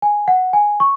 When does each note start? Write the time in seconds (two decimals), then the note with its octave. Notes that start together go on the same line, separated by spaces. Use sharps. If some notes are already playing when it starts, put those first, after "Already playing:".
0.02 G#5
0.28 F#5
0.53 G#5
0.80 C#6